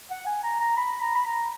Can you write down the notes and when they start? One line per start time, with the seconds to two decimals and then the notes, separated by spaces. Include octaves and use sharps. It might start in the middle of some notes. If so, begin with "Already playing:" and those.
0.11 F#5
0.26 G#5
0.43 A#5
0.60 A#5
0.77 B5
1.01 A#5
1.15 B5
1.26 A#5